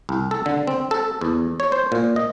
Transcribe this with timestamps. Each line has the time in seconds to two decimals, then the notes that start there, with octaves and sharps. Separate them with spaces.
0.09 C2
0.31 A4
0.46 D3
0.67 C4
0.91 A4
1.21 E2
1.60 C#5
1.72 C5
1.92 A#2
2.16 D#5